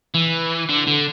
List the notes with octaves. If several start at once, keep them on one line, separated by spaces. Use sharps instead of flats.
E3
D3
D3